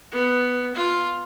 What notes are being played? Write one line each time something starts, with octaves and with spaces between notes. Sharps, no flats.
B3
F4